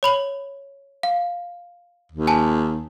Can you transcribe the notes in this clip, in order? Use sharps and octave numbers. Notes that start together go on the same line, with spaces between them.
C#5 B5 F#7
F5
D#2
G#5 A5